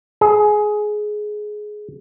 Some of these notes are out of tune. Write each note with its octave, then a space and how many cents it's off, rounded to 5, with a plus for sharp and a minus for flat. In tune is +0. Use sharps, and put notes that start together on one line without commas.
G#4 +15